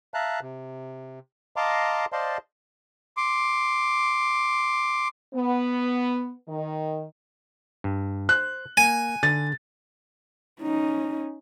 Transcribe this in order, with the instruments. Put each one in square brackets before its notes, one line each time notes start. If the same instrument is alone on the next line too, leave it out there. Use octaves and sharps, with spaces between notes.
[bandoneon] E5 F5 A5 A#5 F#6
C3
D#5 F5 A5 A#5 C6 D6
C5 D5 D#5 F5 A5 C6
[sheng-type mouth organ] C6 D6
[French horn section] B3
D#3
[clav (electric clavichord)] G2
[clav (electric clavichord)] C5 [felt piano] F#6
[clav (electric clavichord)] A#3 [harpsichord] G#5
[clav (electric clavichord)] D3 [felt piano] A6
[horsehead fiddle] C#4 D#4